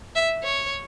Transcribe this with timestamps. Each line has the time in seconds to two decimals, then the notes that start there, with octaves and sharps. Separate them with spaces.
0.16 E5
0.44 C#5